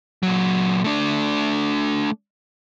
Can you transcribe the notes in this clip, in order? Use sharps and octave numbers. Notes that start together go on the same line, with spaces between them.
A#2 F#3
A3 D4